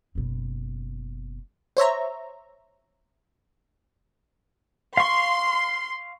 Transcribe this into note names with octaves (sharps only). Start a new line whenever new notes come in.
F#1 B2
C5 C#5 E5 A#5
F5 C6 C#6